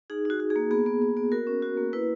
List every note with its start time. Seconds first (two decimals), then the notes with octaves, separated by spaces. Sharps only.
0.10 D#4 G#4
0.25 D#4 F#4
0.40 F#4
0.50 G#4
0.56 A#3
0.71 B3 G#4
0.86 B3
1.02 B3
1.17 B3
1.32 F#4 A#4
1.47 C#4
1.62 F#4
1.77 A#3
1.93 E4 B4